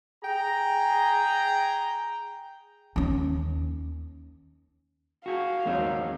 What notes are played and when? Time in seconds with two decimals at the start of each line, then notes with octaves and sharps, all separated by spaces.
0.24 G#4 G5 A#5
2.96 D#2 C#4
5.26 F#4 G#4 F5
5.65 D#2 F#3 G#3 A#3 C4 D#4